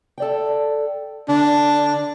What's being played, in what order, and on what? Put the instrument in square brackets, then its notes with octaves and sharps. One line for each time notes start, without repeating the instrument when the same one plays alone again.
[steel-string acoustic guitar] A4 D5 G5
[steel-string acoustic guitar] D3 [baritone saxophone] D4